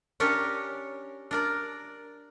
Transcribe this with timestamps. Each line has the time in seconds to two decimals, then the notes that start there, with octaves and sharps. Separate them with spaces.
0.20 C#4 D4 G4 A#4 C#5
1.31 D4 A#4 D5